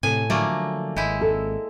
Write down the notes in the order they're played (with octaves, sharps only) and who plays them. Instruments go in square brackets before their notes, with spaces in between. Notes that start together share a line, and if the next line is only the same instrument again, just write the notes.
[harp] A2 A3 [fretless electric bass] C3 [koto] G#5
[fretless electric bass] D3 F3 F#3 [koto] A3 A#3 [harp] D5 G#5
[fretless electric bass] G#1 [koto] G#3 E4 [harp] G6
[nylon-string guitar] A4